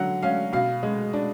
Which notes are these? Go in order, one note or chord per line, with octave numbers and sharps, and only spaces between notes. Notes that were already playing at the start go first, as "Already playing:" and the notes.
Already playing: D3 F#3 F#5
C#4 F5
B2 F5
G#3
D4